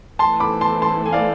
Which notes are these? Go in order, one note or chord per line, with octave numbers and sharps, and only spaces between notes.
E3 A3 E4 A4 C5 A5 C6
B5 D6
A5 C6
A5 C6
G#5
D5 F5